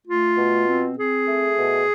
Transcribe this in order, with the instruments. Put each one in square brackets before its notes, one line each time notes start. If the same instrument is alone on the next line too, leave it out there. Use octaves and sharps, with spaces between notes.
[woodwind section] A3 F4
B2
C4
C4 G#4
A3
B2